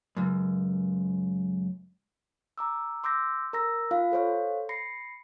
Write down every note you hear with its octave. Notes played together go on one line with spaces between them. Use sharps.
C#2 F#2
A#5 D6 E6
C6 D6 E6 G6 A#6
A#4 A#5 E6 A#6
F4 F5
A4 C5 C#5 F5
B5 A#6 C7 C#7